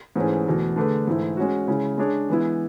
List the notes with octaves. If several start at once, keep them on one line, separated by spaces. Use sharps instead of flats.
G#2 E3 A3 C#4 G#4
E2 B2 A3
D3 A3 D4 G#4 B4
G#2 E3 A3 E4
G#3 C#4 F#4
C#3 G#3 C#4 E4
G#3 D4 G#4 C#5
E3 G#3 B3 E4